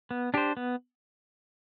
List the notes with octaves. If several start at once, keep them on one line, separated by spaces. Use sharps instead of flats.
B3
D4 G4 C5
B3